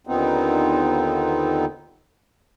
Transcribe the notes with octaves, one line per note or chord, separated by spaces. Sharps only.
D#2 A#2 D3 B3 C4 D#4